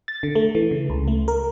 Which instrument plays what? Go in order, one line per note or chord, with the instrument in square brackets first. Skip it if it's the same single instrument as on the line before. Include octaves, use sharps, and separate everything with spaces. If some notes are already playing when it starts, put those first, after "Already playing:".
[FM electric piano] A6
D3
A3
E3
C#3
C#2
A3
A#4